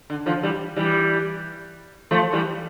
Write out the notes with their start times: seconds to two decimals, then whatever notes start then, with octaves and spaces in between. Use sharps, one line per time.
0.10 D3
0.26 D3 F3
0.43 E3 G3
0.76 E3 G3
2.11 F3 A3
2.33 E3 G3